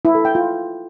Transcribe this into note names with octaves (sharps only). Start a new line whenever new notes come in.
E4
A4
G5
F4